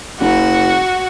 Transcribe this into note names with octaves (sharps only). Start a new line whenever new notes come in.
F#1 F#4